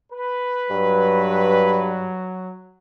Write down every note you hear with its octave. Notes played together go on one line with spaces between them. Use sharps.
B4
G2 F#3